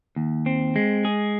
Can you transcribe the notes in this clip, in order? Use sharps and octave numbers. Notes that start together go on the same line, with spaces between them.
D#2
C4
G#3
G#4